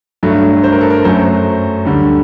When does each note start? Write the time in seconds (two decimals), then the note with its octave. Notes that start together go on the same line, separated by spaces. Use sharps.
0.23 G2 F#3 A3
0.63 C5
0.72 A#4
0.81 A4
0.90 A#4
1.04 F#2 F#3 A3 C5
1.85 D2 D3 G3